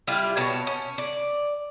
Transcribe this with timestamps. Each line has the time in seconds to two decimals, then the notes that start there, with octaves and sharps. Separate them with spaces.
0.07 G3 E4 F4 G4
0.37 B2 C#5 A5
0.67 C#4
0.98 D5